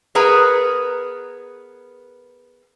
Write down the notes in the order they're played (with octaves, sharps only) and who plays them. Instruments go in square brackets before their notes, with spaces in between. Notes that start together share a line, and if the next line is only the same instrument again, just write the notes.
[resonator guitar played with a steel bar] B3 G#4 A#4 B4 A#5